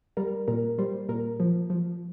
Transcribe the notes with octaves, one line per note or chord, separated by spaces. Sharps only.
G3 A#4
A#2 A#4
G3 C5
A#2 A#4
F3
F3